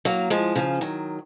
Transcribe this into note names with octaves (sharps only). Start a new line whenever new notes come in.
F#3 A#3
F3 G#3
C#3 F3
D#3 F#3